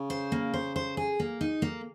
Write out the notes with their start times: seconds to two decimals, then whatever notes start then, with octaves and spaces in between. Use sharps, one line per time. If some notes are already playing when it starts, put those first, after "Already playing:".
Already playing: C#3
0.10 C5
0.32 A#3
0.54 C5
0.76 C5
0.97 G#4
1.20 A#3
1.41 D#4
1.62 A#3